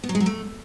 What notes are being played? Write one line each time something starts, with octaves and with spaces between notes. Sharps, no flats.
B3
F#3
G#3
F#3
A3